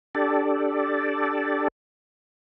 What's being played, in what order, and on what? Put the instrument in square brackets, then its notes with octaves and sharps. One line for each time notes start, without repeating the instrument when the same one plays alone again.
[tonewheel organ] D4 G4 A4 D5